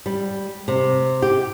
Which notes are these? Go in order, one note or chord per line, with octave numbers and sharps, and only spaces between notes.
G3
C3
G4